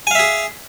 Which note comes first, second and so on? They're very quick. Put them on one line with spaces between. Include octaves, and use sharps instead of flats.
G#5 F5 E5 G#4